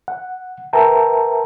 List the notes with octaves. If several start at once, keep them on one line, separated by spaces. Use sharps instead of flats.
F#5
A#4 B4 E5 G5 A5 A#5